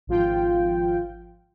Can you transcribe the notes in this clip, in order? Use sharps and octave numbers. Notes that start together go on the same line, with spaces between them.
G#1 F3 F4 G5